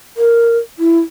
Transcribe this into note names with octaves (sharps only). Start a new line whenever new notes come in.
A#4
E4